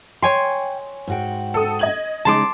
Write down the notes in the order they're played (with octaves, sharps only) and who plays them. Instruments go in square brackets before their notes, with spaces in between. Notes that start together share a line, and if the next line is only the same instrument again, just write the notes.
[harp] C#5 G#5 C6 [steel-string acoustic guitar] G5
[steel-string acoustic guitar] G#2 F#4 G5
[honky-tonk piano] A4 D#6
D#5 G#6 F#7
[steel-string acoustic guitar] C#3 G#3 D#4 [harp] A5 C6 D6